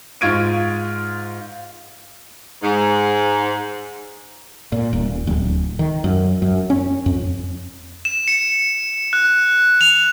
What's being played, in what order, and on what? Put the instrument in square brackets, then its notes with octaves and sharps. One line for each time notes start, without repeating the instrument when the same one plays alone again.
[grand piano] G#2 F4 C#6 G#6 D7 D#7
[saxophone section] G#2
[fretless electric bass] A#2
D#1
D1
D#3
F#2
F#2
C#4
F2
[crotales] E7
C#7
F#6
F7